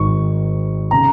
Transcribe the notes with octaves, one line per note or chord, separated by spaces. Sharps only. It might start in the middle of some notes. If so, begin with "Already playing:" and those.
Already playing: G#1 G#2 D#3 C#6
C#3 A#5